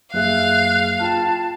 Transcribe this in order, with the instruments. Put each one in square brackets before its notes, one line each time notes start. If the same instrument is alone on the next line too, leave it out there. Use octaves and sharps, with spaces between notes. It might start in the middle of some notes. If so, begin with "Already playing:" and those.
[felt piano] F#1 G#4 E5 [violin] F5 [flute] F#6
[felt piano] F4 G5 [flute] A5